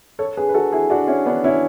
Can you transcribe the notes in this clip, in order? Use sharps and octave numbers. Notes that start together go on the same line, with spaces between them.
A4 C#5
G#4 B4
B4
F#4 A4
E4 G#4
D4 F#4
C#4 E4
B3 D4
C#4 E4